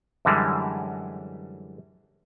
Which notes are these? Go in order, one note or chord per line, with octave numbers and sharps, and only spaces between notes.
F#2 D3 E3 G3 G#3